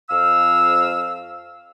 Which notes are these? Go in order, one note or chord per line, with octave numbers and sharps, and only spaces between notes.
F2 F5 E6